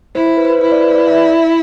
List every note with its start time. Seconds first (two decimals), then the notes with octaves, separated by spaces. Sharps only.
0.15 E4 C5
0.26 C5
0.37 B4
0.45 C5
0.50 B4
0.61 E4 C5
0.72 D5
0.84 B4
0.95 D5
1.07 E5